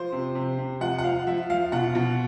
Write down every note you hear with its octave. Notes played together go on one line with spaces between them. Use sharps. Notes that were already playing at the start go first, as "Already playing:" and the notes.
Already playing: F3 C5
C3
C3
C3
F3 F#5
F#5
F3 F5
F3 E5
F3 F5
B2 F#5
B2